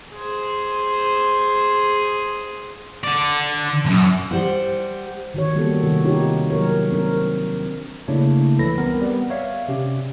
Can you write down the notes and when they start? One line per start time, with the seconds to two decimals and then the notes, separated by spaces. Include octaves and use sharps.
0.14 G#4 C5
3.04 D3 D5
3.85 B1 F#2
4.31 G3 C5 F#5
5.34 D#3 F#4 C#5
5.55 G3 A#3 B3 F#4 G4 A4
5.83 C3 D#3 F#4
6.05 D#4 F4 G4 C#5
6.50 F#3 A#4 C#5
6.91 C4 D4 A#4
8.08 C#3 A3 A#3 D4 E4 C#5
8.59 C#2 E3 A4 B5 A#6
8.77 G3 B3 C4 A#4
9.02 G3 B3
9.30 C#5 D5 E5 F5
9.68 C3 C#4 G4